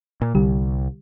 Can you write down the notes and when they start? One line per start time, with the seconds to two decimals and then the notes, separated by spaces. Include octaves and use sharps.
0.21 A#2
0.35 C2 D3 G3 G4